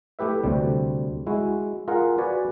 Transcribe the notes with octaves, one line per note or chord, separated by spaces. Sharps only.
A3 E4 G4 B4 E5
D2 C3 G3
G#3 E4 F#4
F4 G#4 A#4 F5 F#5
F#4 B4 D5 F#5 G#5